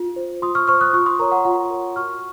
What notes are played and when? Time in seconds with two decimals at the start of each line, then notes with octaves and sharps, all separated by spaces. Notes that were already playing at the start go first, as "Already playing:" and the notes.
Already playing: F4
0.16 C5
0.42 F4 C6 D#6
0.55 C#6 F6
0.67 C5 C#6 F6
0.81 D#6 F#6
0.93 F4 C#6 F6
1.06 C6 D#6
1.19 A#4 C#5 A#5 C#6
1.32 F#5 A#5
1.45 F4 F#5
1.70 A#4 C#5
1.96 F#4 C#6 F6